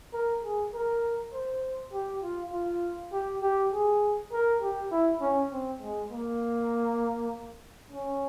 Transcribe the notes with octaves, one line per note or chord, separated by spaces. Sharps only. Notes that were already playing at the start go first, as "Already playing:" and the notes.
A#4
G#4
A#4
C5
G4
F4
F4
G4
G4
G#4
A#4
G4
E4
C#4
C4
G#3
A#3
C#4